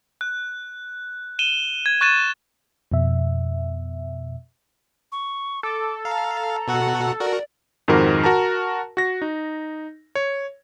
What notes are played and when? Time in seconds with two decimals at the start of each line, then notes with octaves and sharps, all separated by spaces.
0.21 F#6
1.39 D#7 E7 G7
1.86 G#6
2.01 C#6 F#6 A6 D#7 E7
2.92 F2 B2 E5
5.12 C#6
5.63 A4 D6
6.05 F5 A#5
6.68 B2 F#4 F#5
7.20 F#4 A#4 D5
7.88 F2 G#2 D#3 F#4 A#4 C5
8.24 F#4 A#4 A5 A#5
8.97 F#4 A#6
9.22 D#4
10.15 C#5